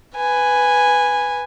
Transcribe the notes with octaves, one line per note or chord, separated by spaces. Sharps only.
B4 G#5